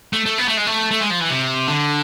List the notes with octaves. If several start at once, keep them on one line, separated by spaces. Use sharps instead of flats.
A3
A3
B3
A3
G#3
A3
A3
G#3
F3
E3
C3
D3